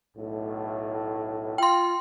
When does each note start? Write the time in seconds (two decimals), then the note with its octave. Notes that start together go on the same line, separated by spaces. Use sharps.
0.17 B1 A2
1.58 F4 G5 C6